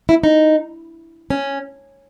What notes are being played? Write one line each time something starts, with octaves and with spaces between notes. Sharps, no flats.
E4
D#4
C#4